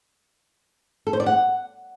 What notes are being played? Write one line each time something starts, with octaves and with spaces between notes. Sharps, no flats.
A4
C5
D5
F#5